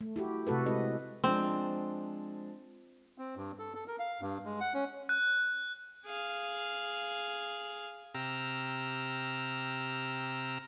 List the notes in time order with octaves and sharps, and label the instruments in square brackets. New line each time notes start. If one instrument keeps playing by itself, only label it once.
[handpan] A3
E4 F#4 G4
C3 A3 F#4 A4 B4
G#3 C4 E4 B4 D#5
[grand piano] F3 G#3 D4 [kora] C4
[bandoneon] C4
G2
A4
A4
A#4
F5
G2
G#3
F#5
C#4
[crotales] F#6
[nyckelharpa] G#4 F5
[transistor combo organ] C3 G4 A#5 E6 F6